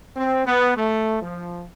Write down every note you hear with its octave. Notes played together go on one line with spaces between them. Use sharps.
C4
B3
A3
F3